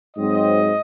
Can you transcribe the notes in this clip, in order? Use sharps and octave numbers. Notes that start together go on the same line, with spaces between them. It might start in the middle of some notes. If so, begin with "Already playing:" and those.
G#2 F#3 C4 D#5